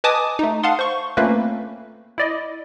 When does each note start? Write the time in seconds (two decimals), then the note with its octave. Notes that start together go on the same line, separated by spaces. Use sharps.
0.04 B4 D#5 G#5 A5 D6 D#6
0.39 A3 D#4
0.63 F5 F#5 A5 C6 D#6
0.79 C5 C#6
1.17 A3 A#3 C4 C#4 F4 B4
2.18 E4 D5 D#5